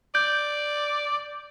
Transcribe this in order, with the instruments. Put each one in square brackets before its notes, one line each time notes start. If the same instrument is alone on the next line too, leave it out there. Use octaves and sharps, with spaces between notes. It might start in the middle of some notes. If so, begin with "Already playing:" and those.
[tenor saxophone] D5 [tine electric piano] G6